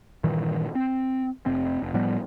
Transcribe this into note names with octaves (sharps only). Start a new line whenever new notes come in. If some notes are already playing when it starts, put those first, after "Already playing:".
G2 A#2 D#3 E3
C4
F1 C3 C4
F1
A2 F3 G3 B3